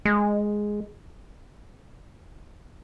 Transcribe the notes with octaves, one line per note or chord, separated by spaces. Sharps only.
G#3